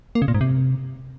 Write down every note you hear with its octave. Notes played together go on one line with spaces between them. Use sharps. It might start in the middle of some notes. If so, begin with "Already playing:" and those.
A#3
C#3
A#2
G#2
C3